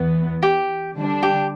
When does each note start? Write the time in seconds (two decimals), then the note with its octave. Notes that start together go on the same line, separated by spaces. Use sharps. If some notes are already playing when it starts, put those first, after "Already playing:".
Already playing: E2 E3 B3
0.43 G4
0.96 D3 G3 D4
1.23 G4